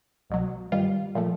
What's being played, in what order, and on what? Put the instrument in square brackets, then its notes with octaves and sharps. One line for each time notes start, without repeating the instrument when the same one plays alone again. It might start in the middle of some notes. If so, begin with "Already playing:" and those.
[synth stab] C2 B2 F#3
G2 D#3 G3 F4
A#2 F3 A3